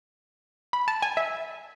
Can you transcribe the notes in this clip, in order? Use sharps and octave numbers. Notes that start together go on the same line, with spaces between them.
B5
A5
G#5
E5